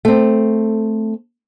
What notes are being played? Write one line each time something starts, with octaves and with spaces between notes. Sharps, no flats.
A3 C4